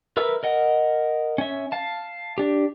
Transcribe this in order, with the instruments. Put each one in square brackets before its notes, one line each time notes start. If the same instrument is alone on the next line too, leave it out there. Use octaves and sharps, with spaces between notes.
[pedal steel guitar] A#4 B4 E5 E6
A#4 D#5 F#5
C#4 E5
F5 A5
D4 G4